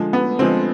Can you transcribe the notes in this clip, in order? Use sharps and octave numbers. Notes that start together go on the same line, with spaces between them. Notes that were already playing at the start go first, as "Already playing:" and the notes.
Already playing: D3 F3 G#3
B3
D3 F3 G#3 C4